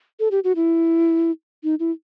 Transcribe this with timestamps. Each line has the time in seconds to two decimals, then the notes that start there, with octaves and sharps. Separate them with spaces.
0.20 A4
0.31 G4
0.44 F#4
0.56 E4
1.64 D#4
1.80 E4